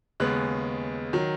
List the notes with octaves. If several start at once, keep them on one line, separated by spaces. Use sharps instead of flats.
D#2 C#3 G#3 B3 F#6
D#3 F#3